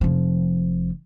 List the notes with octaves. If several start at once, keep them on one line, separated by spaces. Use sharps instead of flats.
F1 F3